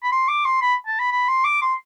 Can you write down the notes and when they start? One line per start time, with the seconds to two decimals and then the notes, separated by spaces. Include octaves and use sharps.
0.03 B5
0.12 C6
0.29 D6
0.45 C6
0.62 B5
0.87 A5
0.99 B5
1.12 B5
1.28 C6
1.45 D6
1.62 C6